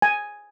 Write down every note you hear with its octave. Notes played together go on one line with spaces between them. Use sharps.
G#5